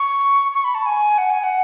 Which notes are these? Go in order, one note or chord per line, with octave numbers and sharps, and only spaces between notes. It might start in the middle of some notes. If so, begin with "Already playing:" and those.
Already playing: C#6
C#6
B5
A5
G#5
F#5
G#5
F#5